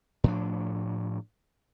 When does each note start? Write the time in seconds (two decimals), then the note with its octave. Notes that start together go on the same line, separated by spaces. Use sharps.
0.24 A2 F3 D4